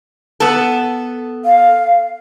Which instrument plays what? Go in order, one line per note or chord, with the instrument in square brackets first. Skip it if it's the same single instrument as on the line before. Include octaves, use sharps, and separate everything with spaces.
[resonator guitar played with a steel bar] B3 A4
[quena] F5